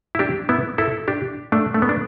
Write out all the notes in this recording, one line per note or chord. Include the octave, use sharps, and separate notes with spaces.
E4
D4 G4
B3 E4
E4 A4
D4 G4
A3 D4
A3
B3
D4